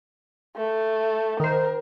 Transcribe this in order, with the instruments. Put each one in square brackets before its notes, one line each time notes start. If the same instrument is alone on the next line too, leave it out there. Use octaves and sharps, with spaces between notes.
[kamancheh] A3
[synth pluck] D#3 C5 [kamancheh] A#4